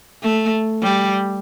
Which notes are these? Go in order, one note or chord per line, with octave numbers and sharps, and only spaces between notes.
A3
G3